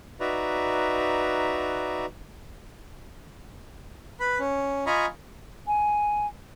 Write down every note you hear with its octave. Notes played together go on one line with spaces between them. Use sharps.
D#4 F#4 B4 D5 E5 A#5
B4 B5
C#4
F4 D#5 G#5 A#5 B5 C#6
G#5